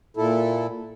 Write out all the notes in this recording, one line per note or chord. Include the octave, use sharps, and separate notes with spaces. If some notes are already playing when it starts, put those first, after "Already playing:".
A#2 E4 A4